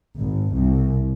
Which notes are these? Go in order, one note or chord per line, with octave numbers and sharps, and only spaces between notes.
G#1
C2